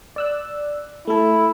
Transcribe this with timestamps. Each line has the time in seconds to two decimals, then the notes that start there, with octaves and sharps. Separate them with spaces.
0.16 D5 E6 F#6
1.07 A3 E4 A4